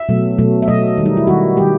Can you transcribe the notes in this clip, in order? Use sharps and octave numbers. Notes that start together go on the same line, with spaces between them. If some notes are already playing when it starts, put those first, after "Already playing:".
Already playing: E5
B2 F#3 A3
B2 F#3 A3
E5
B2 F#3 A3 D#5
D#3 G3
D#4
E4
D#3 G3 F#4
D#3 G3 G4